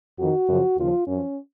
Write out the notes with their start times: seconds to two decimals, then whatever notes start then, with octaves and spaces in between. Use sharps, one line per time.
0.18 F2 D#3 F#4
0.48 F#2 C#3 F3
0.77 D#2 C#3 F3 F4
1.07 F#2 F3 C#4